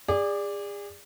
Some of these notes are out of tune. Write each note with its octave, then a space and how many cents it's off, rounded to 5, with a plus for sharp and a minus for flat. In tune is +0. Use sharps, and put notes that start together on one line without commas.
G#4 -35 D5 +0